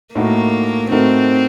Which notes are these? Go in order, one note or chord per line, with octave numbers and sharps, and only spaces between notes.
A2 A3 A#3 D#4 F#4 A#4
A2 A3 C4 D#4 F#4 A#4